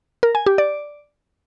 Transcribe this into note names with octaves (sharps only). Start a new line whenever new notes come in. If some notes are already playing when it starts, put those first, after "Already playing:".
A#4
G#5
G4
D5